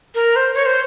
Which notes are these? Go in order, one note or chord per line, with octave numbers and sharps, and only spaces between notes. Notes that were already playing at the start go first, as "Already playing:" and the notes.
A#4
C5
C#5
C5